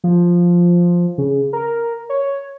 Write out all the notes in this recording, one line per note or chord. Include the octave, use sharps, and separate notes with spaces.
F3
C#3
A#4
C#5